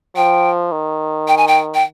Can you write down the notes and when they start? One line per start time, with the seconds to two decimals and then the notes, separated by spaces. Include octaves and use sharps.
0.16 F3 G5
0.72 D#3
1.28 G5
1.37 G#5
1.48 G5
1.75 G5